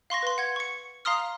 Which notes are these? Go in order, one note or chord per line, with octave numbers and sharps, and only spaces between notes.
F5 C6 C#6 A#6
B4 C6
F#5 G#6
C#6 C#7
F5 A#5 C6 D#6 F6